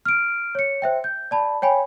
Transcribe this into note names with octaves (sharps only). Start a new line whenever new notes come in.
F6 D7
C#5 C#7
C5 E5 G5
G6
D5 A5 B5
C#5 G5 G#5 B5